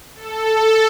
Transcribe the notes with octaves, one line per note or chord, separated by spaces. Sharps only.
A4